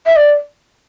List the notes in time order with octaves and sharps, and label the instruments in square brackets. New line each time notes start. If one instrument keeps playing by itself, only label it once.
[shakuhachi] E5
D5